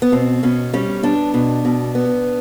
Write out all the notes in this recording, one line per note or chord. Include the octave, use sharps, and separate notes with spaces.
B3
B2 C4
B2 C#4
G3 C#4
B3 D4
B2
B2
B3